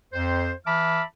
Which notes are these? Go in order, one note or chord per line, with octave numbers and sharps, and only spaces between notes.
F2 C5
E3 E5 A5 B5 D6 F6